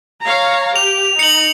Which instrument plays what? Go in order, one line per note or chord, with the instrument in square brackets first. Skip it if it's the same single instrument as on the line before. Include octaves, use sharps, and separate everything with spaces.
[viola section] C#5 F5 A#5
[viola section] G4 [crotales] F7
[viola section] D#4 [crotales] C#7 F#7